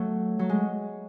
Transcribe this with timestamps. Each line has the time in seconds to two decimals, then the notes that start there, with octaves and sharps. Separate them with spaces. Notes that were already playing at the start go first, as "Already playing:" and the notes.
Already playing: F#3 A3
0.39 F#3
0.49 G#3